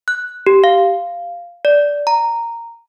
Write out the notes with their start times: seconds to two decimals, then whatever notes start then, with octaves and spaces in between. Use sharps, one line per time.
0.08 F#6
0.47 G4
0.64 F5
1.65 D5
2.07 A#5